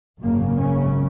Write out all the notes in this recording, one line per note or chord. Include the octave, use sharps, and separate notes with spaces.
G#1 F#2 C#3 A#3
C#4